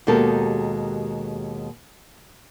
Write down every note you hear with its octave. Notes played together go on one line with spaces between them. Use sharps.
D#2 B2 G#3 G4 A4 A#4